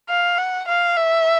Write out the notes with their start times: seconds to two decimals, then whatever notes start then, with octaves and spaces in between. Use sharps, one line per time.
0.09 F5
0.38 F#5
0.68 F5
0.97 E5